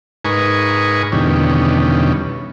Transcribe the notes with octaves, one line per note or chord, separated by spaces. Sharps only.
G#2 D#4 A#4 B4 G#5 C#6
E2 B2 D3 D#3 G3 C#4